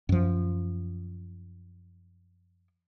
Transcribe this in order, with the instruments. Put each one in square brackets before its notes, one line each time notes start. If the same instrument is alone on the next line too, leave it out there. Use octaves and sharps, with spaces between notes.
[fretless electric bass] F#2 F3